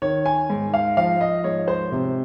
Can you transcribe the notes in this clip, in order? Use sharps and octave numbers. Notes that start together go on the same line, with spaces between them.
D#3 C#5
G#5
G#2
F5
F3 F5
D#5
G#2 C#5
C5
C3